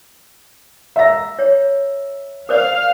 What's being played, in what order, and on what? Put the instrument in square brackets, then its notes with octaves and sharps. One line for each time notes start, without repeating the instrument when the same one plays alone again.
[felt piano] E5 A#5 A#6
[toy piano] C#5
[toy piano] A#4 C5 D5 [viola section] F5